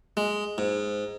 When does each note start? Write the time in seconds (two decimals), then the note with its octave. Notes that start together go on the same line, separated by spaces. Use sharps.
0.17 G#3
0.58 G#2